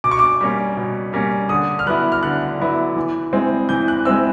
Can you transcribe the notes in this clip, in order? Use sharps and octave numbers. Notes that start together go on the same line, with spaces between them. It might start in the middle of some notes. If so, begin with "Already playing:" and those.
B2 D6
C#6
D6
G3 A#3 C#4
B2
G3 A#3 C#4
D3 D#6
F6
F#3 B3 E4 F#6
F6
D3 F#6
F#3 B3 E4
E3
G#3 C4 E4
E3 G6
F#6
G#3 C4 E4 E6